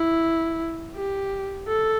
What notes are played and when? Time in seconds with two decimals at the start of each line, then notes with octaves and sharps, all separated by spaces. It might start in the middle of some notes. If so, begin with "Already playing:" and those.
Already playing: E4
0.95 G4
1.68 A4